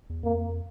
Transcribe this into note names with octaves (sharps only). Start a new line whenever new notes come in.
E2
F2 A#3